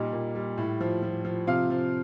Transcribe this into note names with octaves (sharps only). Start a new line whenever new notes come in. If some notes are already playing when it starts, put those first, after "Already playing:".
Already playing: A#2 G3 D#4
A#2
G3
A2
F3
F3
F3
C3 F4 F5
F3